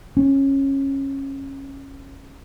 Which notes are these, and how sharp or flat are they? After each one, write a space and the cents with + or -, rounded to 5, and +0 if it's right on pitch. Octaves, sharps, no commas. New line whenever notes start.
C#4 -20